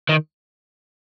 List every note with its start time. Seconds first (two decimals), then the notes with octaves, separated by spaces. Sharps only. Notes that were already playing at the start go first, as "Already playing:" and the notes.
0.09 D#3